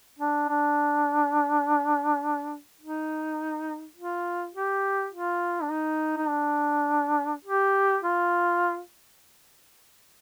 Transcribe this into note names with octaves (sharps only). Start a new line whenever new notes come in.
D4
D4
D#4
F4
G4
F4
D4
D#4
D#4
D4
G4
F4